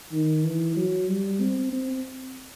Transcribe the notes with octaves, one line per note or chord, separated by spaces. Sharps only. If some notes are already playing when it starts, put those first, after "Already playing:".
D#3
E3
F#3
G3
C4
C4